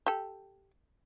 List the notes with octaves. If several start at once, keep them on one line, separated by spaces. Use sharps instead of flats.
G4 A4